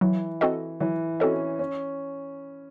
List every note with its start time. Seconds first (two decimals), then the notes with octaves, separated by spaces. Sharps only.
0.01 E3 F#3
0.41 C4 F#4 A4 D#5
0.80 E3 F#3
1.20 C4 C#4 F#4 A4 D#5
1.59 C#4